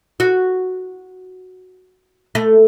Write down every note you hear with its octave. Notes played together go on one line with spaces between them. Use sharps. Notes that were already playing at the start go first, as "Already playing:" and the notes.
F#4
A3